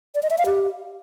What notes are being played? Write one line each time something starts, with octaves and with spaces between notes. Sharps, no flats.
D5
D#5
E5
F5
G4